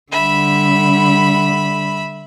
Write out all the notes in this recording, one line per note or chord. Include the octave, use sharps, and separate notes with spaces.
D3 G3 E5 B5